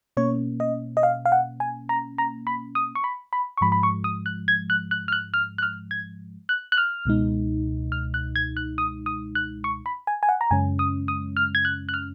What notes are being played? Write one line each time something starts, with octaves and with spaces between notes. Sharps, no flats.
B2 A#3 C#4 C#5
D#5
D#5
F5
F5
F#5
G#5
A#5
A#5
B5
D#6
C#6
B5
B5
C#6
G#2 F3 G#3 B5
B5
C#6
D#6
F#6
G#6
F#6
F#6
F6
F#6
F6
F#6
F6
G#6
F#6
F#6
F6
C#2 B2 G#3 D#4
F6
F#6
G#6
F#6
D#6
D#6
F#6
C#6
B5
G#5
G#5
F#5
A#5
F#2 C#3 G#3 C#4 G#5
D#6
D#6
F6
G#6
F#6
F#6
F6